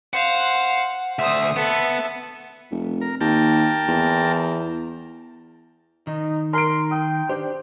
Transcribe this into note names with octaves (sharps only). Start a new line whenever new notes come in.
C5 F5 F#5
D2 C5 E5 D#6
B3 A4 E5
F1
A#4
D#2 A#4 G5 A5
E2
D#3 D#4
A#4 C6 D7
G5 D#6
D4 G4 C5